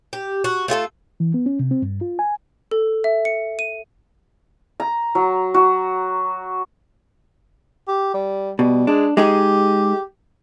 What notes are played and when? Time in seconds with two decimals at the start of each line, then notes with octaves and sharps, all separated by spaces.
0.13 G4
0.44 F#4
0.68 A3 F4 G#4 A4
1.20 E3
1.34 B3
1.46 C#4
1.59 C3
1.71 C4
1.82 G2
2.01 F4
2.19 G#5
2.71 A4
3.04 E5
3.25 C#7
3.59 D#7
4.80 A#5
5.15 F#3
5.54 F#4
7.88 G4
8.14 G3
8.59 B2 G3
8.87 G#3 D4
9.17 G#3 D#4 G4 G#4